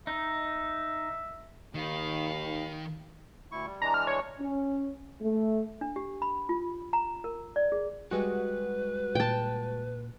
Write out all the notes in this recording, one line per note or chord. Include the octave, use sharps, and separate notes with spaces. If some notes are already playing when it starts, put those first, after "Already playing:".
D#4 E5
D#2 D#3 F5 B5
D2 E4 C#6
G3
E3 G#3 D4 A#5
F6
C#5
C#4
A3
D4
G4
B5
F4
A#5
A#4
D5
G#4
G3 G#3 F#4 B4
A#2 G5 A5